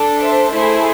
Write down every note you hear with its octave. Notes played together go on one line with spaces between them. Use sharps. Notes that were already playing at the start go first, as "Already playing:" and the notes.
Already playing: D4 A4
C5 E5
A3 E4 G#4 C5